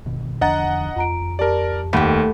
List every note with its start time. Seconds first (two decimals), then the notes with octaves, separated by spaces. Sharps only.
0.06 G1 B2 D#3
0.41 E2 D3 F3 D4 D#5 F#5 A#5 A6
0.96 F2 F4 A#5 D7
1.39 G4 A#4 D5 A5
1.93 D#2 A3 G4 F#5 B5 B6